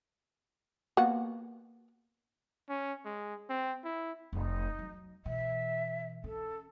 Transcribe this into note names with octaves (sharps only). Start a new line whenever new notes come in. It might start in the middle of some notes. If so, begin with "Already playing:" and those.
A#3 B3 F#4
C#4
G#3
C4
E4
F1 D#4
F#3
B2 E3 E5
C#4 A4